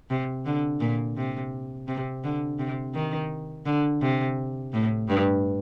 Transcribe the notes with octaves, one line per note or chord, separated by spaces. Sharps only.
C3
D3
A#2
C3
C3
D3
C3
D#3
D3
C3
A2
G2